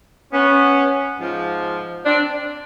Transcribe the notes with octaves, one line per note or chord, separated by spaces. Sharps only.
B3 C#4
G#2 F3
C4 D4